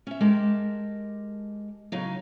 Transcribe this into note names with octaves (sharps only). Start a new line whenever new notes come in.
C#4 E5
G#3 G4 A#4 A5
C#3 F#3 D#4